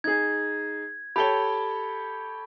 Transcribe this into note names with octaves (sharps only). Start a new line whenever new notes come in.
D#4 G#4 G#6
G4 A4 C#5 B5 G7